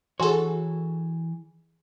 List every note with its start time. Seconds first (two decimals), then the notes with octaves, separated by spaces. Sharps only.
0.20 E3 F#4 G#4 A4 C#5 G#5 C6